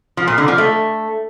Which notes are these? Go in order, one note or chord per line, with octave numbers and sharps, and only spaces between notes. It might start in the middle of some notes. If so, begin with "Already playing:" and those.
F3
A#2
D3
F3
A3